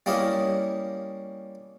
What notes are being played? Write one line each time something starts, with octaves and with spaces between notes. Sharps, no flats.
G3 A#3 C#4 E4 D#5